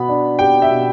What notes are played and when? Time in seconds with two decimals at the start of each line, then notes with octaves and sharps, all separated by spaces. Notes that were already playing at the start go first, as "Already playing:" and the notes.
Already playing: B2 B3 B5
0.09 D4
0.39 G4 G5
0.62 E5
0.70 B2